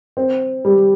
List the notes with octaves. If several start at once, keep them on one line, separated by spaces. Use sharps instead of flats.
C4
G3